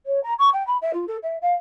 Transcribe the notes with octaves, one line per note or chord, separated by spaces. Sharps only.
C#5
A#5
C#6
G5
B5
E5
F4
A4
E5
F5